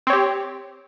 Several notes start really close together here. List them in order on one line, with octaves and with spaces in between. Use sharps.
C4 C#5 G4